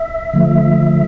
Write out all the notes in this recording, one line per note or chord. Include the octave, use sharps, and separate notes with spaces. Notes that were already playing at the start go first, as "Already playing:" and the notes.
Already playing: E5
D3 F3 A3